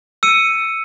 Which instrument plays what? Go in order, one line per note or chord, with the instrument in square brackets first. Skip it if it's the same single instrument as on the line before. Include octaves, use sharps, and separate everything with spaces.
[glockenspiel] E6 C#7 D#7